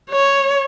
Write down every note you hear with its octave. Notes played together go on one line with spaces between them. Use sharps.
C#5